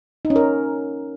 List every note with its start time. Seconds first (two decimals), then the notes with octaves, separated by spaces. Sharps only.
0.25 D#4
0.30 C#4
0.36 A#4